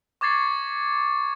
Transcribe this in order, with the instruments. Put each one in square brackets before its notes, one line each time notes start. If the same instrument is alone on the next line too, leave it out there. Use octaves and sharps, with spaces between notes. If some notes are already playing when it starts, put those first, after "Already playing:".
[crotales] C#6 D6 G#6 A6 C7 C#7